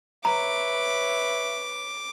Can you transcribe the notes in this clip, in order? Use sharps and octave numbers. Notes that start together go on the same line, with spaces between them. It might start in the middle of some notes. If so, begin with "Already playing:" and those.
B4 C#5 E5 A#5 D6